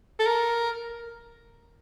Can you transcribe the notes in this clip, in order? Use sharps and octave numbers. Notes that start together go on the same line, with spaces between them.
A4
A#4